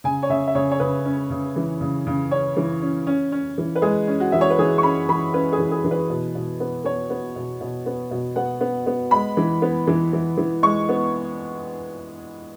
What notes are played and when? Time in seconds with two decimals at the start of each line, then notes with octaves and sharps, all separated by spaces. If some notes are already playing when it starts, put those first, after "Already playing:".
0.04 C#3 G#5
0.23 C#5
0.30 C#3 E5
0.48 E5
0.55 C#3 C#5
0.71 C#5
0.80 C#3 B4
1.05 C#4
1.30 C#3
1.56 E3
1.81 C#3
2.07 C#3
2.31 C#4 C#5
2.57 E3
2.82 C#4
3.07 C#4
3.32 C#4
3.58 E3
3.75 B4
3.82 G#3 G#4
4.07 C#4
4.20 F#4
4.32 E3 E5
4.41 C#5
4.50 B4
4.58 E3 G#4
4.78 C#6
4.83 C#4 B5
5.09 E3 B5
5.33 C#4 B4
5.53 G#4
5.58 E3
5.71 G#4
5.84 E3
5.91 B4
6.10 B2
6.35 B2
6.60 B3
6.84 B3 C#5
7.10 B3
7.36 B2
7.61 B2
7.86 B3
8.11 B2
8.36 B3 F#5
8.61 B3
8.87 B3
9.11 G#3 B5
9.37 E3
9.62 B3
9.87 E3
10.13 E3
10.37 E3
10.63 G#3 C#6
10.89 B3